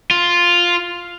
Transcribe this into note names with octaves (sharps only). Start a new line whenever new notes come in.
F4